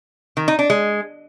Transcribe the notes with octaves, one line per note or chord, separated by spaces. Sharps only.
D#3
D#4
D4
G#3